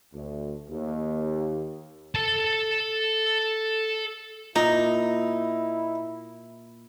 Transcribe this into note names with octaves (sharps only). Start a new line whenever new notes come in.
D2
D#2
A4 A5
A#2 D#4 E4 A#5